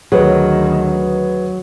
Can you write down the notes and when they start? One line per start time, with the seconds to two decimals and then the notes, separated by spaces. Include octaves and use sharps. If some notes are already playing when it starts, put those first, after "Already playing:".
0.12 D2 D#3 F#3 G#4 B4